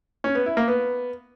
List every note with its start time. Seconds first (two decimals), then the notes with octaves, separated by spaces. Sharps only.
0.24 C#4
0.35 B3
0.46 E4
0.57 A#3
0.68 B3